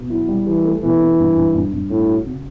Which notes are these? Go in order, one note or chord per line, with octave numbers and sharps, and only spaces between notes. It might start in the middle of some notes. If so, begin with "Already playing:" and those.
Already playing: B2
F#3 E4
G3
E3 G4
A3
B2 E3
C#4
G2
G2
G2
G2
A2 C#4
F#4
C#3